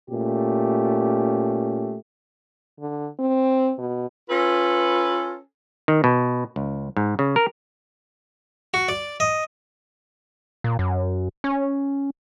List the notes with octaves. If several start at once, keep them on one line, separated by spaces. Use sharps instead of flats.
A#2 A3 C#4 G4
D3
C4
B2
C#4 F4 A4 B4
D#3
B2
C#2
G#2
C#3
A#4
F#4
D5
D#5
A#2
F#2
C#4